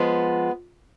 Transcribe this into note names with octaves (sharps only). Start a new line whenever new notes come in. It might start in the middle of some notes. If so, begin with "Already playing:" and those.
Already playing: F3 G#3 B3